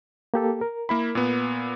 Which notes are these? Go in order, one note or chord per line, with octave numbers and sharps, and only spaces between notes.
A#3 G4 A4
A#4
A#3 E4 B5
A#2 B3